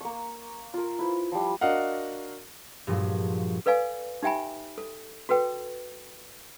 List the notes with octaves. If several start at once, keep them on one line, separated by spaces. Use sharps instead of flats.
A#3 C#6
F4 A#4
E4 B4 C5
F3 G3
D4 F#4 A#4 D#5 F5 F#5
G2 A#2 F3 F#3 G#3
A4 B4 D5 F5 G#5
D#4 G4 E5 G5 G#5 B5
A4
F#4 A4 B4 G5